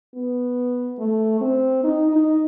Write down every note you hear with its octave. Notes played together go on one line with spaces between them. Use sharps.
B3
A3
C4
D#4
D#4